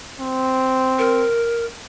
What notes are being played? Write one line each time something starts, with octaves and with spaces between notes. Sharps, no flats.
C4
A#4